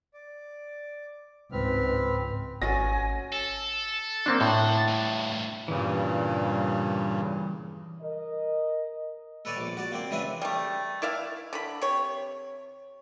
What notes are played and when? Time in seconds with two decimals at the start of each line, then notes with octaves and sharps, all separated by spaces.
0.14 D5
1.52 C#2 G#2 C4 B4 F6
2.62 G#1 C#4 F#4 A4 G#5 A#6
3.32 A4
4.26 A#3 C4 D4
4.41 A2 A4 F#5
4.88 E2 G2
5.68 G2 A#2 C#3 E3 G3
8.02 A#4 D#5
9.45 A4 B4 C#5 D5 G#5
9.57 A#1 D6
9.77 F#4 D5 A5
9.92 A#3 C4 D5
10.11 C#3 E3 D4 B4 E5 G#5
10.42 G3 A3
11.02 E4 D5 E5 F5
11.53 D3 B5
11.82 C3 C#5